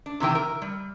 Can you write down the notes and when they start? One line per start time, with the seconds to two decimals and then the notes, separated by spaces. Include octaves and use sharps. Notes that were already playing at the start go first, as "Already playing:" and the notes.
0.06 D4
0.20 C3 D#3 E3 G5
0.35 A#4
0.62 G3